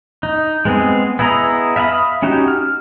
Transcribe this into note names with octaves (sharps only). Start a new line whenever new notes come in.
D#4
G#3 B3 C4 G#4
B3 E4 G#4 D#5 A#5
E5 F5 G#5 B5 D#6
C#4 D#4 F#4 G4
F6